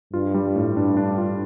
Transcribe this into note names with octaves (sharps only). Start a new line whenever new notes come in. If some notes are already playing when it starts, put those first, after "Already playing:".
G2 F4
G3
A2
G2 D4
D4
F4